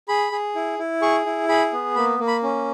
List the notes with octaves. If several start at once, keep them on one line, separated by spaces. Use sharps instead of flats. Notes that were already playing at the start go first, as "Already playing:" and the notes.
G#4 B5
G#4
E4
E4
G#4 C#6
E4
G#4 B5
B3
A#3 B5
A#3
B5
C#4